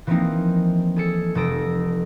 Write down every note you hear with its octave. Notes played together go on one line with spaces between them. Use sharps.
E3 F3 G#3 A#3 C4 D#4
G#4 A4 C#7
F1 G#3 A4 D#6 A#6 D7